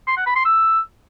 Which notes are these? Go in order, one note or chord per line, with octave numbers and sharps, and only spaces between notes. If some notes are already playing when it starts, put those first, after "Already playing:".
C6
F#5
B5
C6
E6